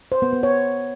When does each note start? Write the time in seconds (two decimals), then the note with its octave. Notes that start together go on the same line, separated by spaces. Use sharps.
0.12 C5
0.22 B3
0.33 B3
0.43 C#5